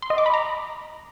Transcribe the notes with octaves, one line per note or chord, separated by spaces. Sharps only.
C6
D#5
D6
B5
A#5